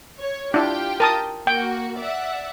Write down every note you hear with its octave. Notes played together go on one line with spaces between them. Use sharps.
C#5
D4 E4 F4 G4 G5
A#4 A5 D#6
A#3 F#4 G5
D5 E5 F#5